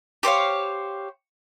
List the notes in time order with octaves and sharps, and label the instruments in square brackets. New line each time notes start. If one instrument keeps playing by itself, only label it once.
[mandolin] G4 C5 C#5 F5